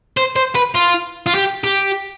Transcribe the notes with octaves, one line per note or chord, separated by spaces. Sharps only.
C5
C5
B4
F4
F4
G4
G4